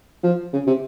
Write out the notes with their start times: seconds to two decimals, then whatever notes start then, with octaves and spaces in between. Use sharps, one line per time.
0.23 F3
0.53 C#3
0.67 C3